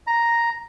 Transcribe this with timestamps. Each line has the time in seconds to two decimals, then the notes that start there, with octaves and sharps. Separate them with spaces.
0.07 A#5